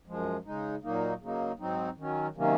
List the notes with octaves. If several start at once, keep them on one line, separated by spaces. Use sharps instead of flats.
F#2 F3 G#3
C#3 G#3 D#4
A#2 F#3 A#3 D#4
C#3 F#3 A#3 D#4
G#2 F#3 C4 D#4
D#3 F#3 C#4
C3 D#3 F#3 A#3 C#4